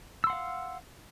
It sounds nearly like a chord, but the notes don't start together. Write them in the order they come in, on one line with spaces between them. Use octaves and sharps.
E6 C6 F#5 F5